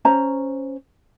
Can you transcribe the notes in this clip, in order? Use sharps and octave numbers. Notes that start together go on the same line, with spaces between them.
C#4 C5 A#5